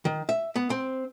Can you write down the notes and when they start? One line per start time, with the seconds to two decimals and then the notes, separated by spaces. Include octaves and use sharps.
0.05 D#3
0.29 E5
0.56 B3
0.70 C4